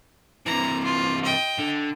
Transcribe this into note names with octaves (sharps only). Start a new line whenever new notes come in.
C3 E3 A#5
F4
D#5 G5
D3